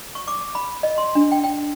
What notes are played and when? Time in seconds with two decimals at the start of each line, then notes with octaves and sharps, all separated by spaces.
0.15 C#6
0.28 D6
0.55 B5
0.83 D#5
0.98 C6
1.15 D4
1.32 G5
1.44 G5